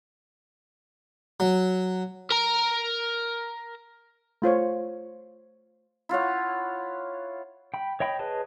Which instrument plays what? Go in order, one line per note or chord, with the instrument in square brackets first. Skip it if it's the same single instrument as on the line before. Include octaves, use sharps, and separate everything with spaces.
[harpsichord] F#3
[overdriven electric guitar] A#4 A#5
[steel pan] A3 F4 C5 C#5
[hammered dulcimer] E4 F4 C#5 F#5
[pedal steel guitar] G5 B5
C#5 D#5 G5 B5
G#4 B4 C#5 D#5 A5